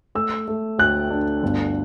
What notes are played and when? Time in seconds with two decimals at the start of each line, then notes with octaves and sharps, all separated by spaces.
0.15 A3 E6
0.48 A3
0.78 D2 F#6
1.10 D4
1.43 G1